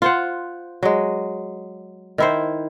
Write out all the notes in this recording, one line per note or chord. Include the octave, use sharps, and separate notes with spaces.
F4 C5 F#5
F#3 G#3
D#3 E4 C5